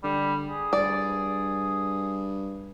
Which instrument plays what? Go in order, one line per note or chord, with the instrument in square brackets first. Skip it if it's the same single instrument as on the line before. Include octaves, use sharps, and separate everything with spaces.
[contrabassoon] D3 [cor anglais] G3
[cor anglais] G#4
[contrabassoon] G2 [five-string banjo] D5